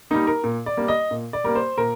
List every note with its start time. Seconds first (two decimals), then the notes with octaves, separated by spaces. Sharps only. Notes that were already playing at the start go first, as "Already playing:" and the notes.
0.11 G3 A#3 D#4
0.27 A#4
0.44 A#2
0.66 D5
0.77 G3 A#3
0.88 D#5
1.11 A#2
1.33 D5
1.44 G3 A#3 A#4
1.55 C5
1.78 A#2 A#4